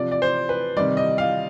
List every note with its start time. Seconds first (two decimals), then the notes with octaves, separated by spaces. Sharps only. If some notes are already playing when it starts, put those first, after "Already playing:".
Already playing: C3 F3 D5
0.12 D5
0.22 C5
0.49 B4
0.77 C3 D#3 G3 D5
0.97 D#5
1.18 F5